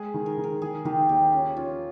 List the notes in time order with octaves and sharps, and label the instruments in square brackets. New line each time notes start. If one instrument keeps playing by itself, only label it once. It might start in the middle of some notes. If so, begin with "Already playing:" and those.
Already playing: [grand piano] G#3 [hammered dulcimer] G#4
[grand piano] D#3
[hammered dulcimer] A#4
[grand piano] D#3
[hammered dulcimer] A#4
[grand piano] D#3 [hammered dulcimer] G#4
[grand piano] D#3 [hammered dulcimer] G4
[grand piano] D#2 [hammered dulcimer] G4
[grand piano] C#4 [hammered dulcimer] F4
[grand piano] C#4 [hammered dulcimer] F4